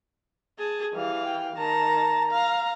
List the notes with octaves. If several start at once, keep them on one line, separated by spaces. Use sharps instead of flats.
G#4 A5
E3 G3 F5
G5
D#3 A5 A#5
F5 A#5